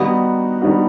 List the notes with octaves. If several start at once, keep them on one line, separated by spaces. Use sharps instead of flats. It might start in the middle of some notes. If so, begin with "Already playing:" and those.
Already playing: D#3 G3 B3 D#4 F#4
D#3 G3 B3 D#4 F#4